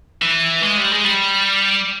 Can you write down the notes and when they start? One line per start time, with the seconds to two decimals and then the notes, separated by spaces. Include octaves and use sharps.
0.22 E3
0.63 G#3
0.78 G3
0.92 G#3
1.04 G3